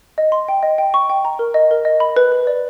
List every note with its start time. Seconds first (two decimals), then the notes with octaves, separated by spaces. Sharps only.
0.18 D#5
0.32 C6
0.48 G5
0.63 D#5
0.78 G5
0.94 C#6
1.10 G5
1.25 A#5
1.39 A#4
1.54 D#5
1.71 A#4
1.85 D#5
2.00 B5
2.17 B4
2.32 B4
2.47 D5